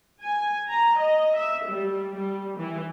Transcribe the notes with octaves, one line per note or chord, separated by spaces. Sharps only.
G#5
A#5
D#5
E5
G3
G3
E3